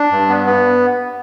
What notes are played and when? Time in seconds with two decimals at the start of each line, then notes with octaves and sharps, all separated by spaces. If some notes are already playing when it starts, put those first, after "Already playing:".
Already playing: D4
0.11 G2
0.29 B3
0.46 B3